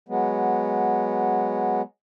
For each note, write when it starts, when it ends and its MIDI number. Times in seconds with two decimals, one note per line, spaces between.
0.09 1.82 54
0.09 1.82 56
0.09 1.82 59